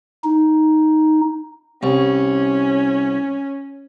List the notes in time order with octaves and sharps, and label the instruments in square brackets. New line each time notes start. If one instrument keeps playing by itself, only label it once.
[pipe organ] D#4
[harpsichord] C2 [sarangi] C#4